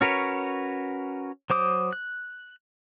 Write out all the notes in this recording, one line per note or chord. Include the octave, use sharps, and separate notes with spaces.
C#4 F#4 A#4 B4 C#5
F#3 C5 D6 D#6
F#6